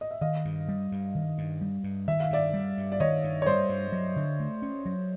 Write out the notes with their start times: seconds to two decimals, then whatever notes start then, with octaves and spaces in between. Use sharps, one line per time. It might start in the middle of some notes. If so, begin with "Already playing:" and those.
0.01 D#5
0.11 E5
0.21 D#3 D#5 F5
0.45 G2
0.68 G3
0.92 G2
1.15 D#3
1.38 G2
1.61 G3
1.83 G2
2.07 D#3 E5
2.20 F5
2.30 G2 D5 E5
2.54 G3
2.78 G2
2.92 D5
3.00 D#3 C#5 D#5
3.24 G2
3.42 C#5
3.46 G3 C5 D5
3.69 G2
3.92 F#3
4.16 D3
4.40 A3
4.62 C#4
4.86 F#3